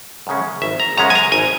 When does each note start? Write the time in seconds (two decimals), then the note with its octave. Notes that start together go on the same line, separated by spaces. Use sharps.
0.27 F#2 C#3 G#3 C#4
0.62 G#1 E5
0.80 A#5
0.97 F#2 C#3 G#3 C#4 A#5
1.10 G#5
1.15 A#5
1.32 G#1 G#5